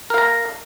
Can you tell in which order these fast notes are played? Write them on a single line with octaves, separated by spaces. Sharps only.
A#4 F5 A#5